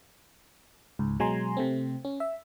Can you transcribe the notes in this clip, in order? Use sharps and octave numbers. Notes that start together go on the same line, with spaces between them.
C#2 G#2
B2 F#3 G#3 G#5 A#5 C6
C3 A3 C4
C#4
E5